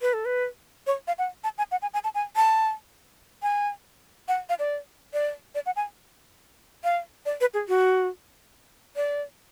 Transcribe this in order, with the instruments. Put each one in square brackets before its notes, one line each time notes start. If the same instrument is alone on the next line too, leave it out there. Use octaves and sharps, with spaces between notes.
[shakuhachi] B4
A4
B4
C#5
F5
F#5
A5
G#5
F#5
G#5
G#5
A5
G#5
A5
G#5
F#5
F5
D5
D5
D5
F#5
G#5
F5
D5
B4
G#4
F#4
D5